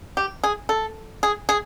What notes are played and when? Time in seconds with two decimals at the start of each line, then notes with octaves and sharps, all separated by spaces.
0.17 G4
0.44 G#4
0.69 A4
1.23 G#4
1.49 G#4